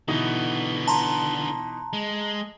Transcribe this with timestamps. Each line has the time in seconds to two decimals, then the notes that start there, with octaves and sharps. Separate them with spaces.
0.08 B2 D3 E3 B3 D#4
0.88 A5 A#5 C6
1.93 G#3